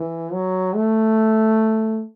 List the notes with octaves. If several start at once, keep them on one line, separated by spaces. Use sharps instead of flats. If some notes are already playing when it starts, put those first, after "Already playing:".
Already playing: E3
F#3
A3